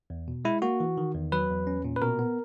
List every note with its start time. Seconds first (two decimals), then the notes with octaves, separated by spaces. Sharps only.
0.10 E2
0.28 B2
0.45 G#3 E4
0.62 A#3 F#4
0.80 E3
0.98 D#3
1.14 E2
1.32 F#3 B4
1.50 E2
1.67 C#4
1.85 A#2
1.96 B4
2.02 B2 A#4
2.19 B3